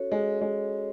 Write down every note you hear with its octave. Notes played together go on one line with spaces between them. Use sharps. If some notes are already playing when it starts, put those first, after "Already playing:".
Already playing: C#4 F#4 A4 C#5
G#3
G#3